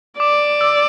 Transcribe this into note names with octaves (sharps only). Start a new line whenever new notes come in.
D5 D6
E6